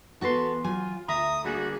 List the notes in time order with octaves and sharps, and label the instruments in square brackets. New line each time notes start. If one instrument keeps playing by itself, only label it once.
[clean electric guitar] E3 C6 [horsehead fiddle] B3 [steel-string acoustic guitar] F#4 A4 B4
[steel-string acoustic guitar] F#3 G#5 [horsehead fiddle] F4
[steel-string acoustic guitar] D2 E5 [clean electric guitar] A#5 [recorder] D#6
[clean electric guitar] D3 G3 [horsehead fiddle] A#3 G#4 [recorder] F#4